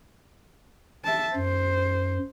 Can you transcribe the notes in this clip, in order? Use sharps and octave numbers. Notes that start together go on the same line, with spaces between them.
E5 A5
F#2 C5